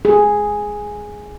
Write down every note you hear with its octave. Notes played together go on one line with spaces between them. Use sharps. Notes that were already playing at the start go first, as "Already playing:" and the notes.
G#4